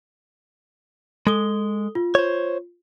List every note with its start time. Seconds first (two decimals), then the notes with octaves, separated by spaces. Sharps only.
1.27 G#3 A4 D#6 G7
1.95 F4
2.15 C5 C#5